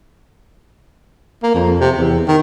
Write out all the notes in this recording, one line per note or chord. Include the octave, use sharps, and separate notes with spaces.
A#3
F2
C3
E2
D#3